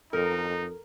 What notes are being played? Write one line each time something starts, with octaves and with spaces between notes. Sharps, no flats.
F2 D#4 A4 A#4